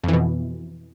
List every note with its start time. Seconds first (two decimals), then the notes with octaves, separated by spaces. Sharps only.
0.03 F2
0.08 E3
0.13 B2